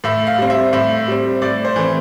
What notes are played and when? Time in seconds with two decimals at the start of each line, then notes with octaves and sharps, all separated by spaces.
0.04 A2 E5
0.27 F5
0.38 G3 C4
0.50 E5
0.73 A2 E5
1.08 G3 C4
1.42 A2 D5
1.65 C5
1.76 E3 A3 C4